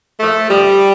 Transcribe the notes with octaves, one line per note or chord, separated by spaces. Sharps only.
A#2 F3 A3
G2 D3 F3 G3